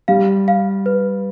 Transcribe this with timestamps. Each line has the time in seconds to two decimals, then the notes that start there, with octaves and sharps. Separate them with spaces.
0.08 G3 F5
0.48 F5
0.86 B4